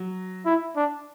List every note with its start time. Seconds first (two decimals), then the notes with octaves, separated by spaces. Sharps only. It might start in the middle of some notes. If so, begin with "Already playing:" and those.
Already playing: F#3
0.46 E4
0.76 D4